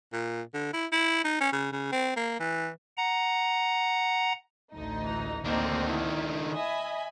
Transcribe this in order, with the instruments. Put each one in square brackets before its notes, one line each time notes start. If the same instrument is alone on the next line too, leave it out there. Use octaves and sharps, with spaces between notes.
[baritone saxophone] A#2
D3
E4
E4
D#4
C#4
C#3
C#3
C4
A#3
E3
[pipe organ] F#5 A#5
[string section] A1 D2 D#4
[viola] E3 A#5
[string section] D2 D#4 [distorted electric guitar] D#3 D4 [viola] A#3 C4
[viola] E4
[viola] D#5 [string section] E5 G#5 B5